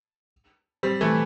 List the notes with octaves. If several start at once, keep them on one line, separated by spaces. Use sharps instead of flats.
G3 C4
E3 A3